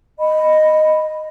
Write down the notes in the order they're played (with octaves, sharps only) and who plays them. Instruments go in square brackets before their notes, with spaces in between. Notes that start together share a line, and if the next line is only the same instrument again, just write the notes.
[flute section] D#5 B5